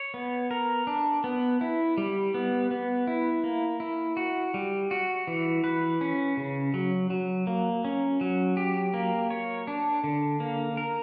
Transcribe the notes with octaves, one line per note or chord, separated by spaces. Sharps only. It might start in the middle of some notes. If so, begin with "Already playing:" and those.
Already playing: C#5
B3
A#4
D4
B3
E4
G3
B3
B3
E4
A#3
E4
F#4
G3
F#4
E3
B4
C#4
C#3
F#3
F#3
A#3
C#4
F#3
G4
A#3
C#5
D4
D3
A#3
A#4